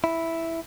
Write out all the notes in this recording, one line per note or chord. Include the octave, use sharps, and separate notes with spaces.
E4